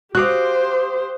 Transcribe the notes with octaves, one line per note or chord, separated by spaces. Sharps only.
F#4 G4 C5 F5 D6 D#6 F#6